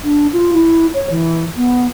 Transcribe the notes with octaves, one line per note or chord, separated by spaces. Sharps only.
D4
F4
E4
C#5
E3
B3